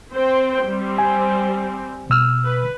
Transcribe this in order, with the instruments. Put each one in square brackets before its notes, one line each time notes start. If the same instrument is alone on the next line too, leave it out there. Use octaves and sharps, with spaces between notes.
[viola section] C4 C5 G5
G3 C4
[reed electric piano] G#5
B2 E6 F6
[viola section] B4